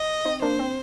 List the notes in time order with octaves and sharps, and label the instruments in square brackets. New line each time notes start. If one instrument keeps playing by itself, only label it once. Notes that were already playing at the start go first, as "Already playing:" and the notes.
Already playing: [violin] D#5
[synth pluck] C4 D#4
[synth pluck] A#3 D4 [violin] C5
[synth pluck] C4